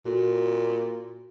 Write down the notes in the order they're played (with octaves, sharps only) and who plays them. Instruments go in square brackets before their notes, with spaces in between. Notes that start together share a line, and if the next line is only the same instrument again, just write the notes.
[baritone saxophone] A#2 [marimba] F#4 A4